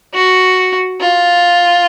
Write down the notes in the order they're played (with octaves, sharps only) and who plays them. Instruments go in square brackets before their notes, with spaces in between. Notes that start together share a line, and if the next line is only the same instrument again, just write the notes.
[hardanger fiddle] F#4
F4